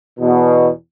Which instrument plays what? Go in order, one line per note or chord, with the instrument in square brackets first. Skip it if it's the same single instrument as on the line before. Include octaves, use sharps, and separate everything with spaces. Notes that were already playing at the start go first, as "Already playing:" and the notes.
[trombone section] E2 B2